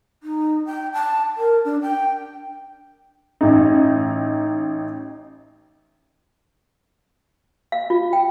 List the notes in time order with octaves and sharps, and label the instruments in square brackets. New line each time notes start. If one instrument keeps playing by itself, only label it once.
[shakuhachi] D#4
G5
A5
A#4
D4
G5
[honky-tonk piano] A1 D#4
[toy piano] F5
F4
G5